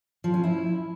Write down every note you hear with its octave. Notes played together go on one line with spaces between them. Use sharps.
F3
C#4
E4